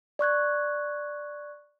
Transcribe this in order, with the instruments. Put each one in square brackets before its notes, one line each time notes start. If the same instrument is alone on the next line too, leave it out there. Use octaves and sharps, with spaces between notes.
[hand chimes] D5 C#6 F#6 G#6